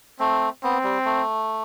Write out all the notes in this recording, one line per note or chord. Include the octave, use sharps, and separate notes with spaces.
A3 C4
B3 C4
G3
A3